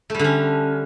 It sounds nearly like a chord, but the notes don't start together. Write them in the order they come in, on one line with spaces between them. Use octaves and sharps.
A3 G3 D3 C#4